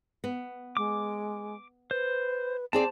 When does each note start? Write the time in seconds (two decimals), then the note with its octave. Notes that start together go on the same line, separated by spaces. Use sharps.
0.24 B3
0.77 G#3 D6
1.91 B4 C5
2.73 C4 G#4 C5 D5 A5